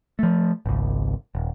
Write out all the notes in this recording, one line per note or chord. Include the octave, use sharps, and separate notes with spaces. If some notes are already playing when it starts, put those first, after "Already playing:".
F3 A3
G#1 C#2
D#1